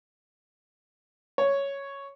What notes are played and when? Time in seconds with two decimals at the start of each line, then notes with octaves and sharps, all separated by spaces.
1.38 C#5